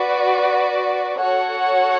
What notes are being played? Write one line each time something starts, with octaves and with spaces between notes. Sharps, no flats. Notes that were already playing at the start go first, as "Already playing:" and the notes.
Already playing: F#4 B4 D5
F#4 A4 C#5 F#5